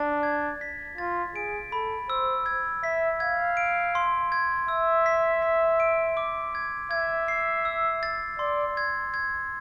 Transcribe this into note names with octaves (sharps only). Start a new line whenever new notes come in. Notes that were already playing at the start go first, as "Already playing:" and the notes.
Already playing: D4 A6
G#6
B6
F4 A6
G#4 D7
A4 B5
C5 E6
G#6
E5 B6
F5 G#6
D7
C6
G#6
E5 E6
B6
B6
D7
D6
G#6
E5 G#6
C7
E6
A6
D5 C6
G#6
G#6